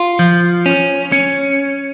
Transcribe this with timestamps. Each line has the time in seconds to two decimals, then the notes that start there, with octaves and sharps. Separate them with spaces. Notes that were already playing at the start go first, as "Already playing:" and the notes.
Already playing: F4
0.19 F3
0.66 C#4
1.12 C#4